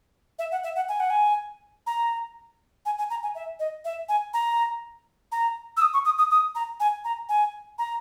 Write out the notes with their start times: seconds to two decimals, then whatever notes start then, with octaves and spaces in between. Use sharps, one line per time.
0.39 E5
0.52 F#5
0.64 E5
0.76 F#5
0.89 G#5
1.00 F#5
1.10 G#5
1.87 A#5
2.86 G#5
2.98 G#5
3.10 A#5
3.23 G#5
3.35 E5
3.59 D#5
3.85 E5
4.09 G#5
4.34 A#5
5.32 A#5
5.77 E6
5.82 D#6
5.93 C#6
6.05 D#6
6.18 D#6
6.31 D#6
6.55 A#5
6.80 G#5
7.05 A#5
7.29 G#5
7.79 A#5